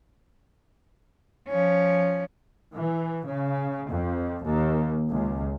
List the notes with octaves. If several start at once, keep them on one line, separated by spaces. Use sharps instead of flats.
F3 C#4
E3
C#3
F2
D#2
C#2